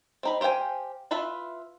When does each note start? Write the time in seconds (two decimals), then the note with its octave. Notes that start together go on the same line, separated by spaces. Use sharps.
0.23 C4 D#4 B5
0.41 G4 C5 F5 G5 G#5
1.11 E4 F4 B4 E5 B5